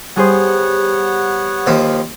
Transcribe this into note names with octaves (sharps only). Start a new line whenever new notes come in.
G3 B3 G4 G#4 C5 C#5 F#5
D#2 F3